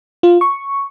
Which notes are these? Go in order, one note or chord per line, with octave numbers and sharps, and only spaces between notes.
F4
C#6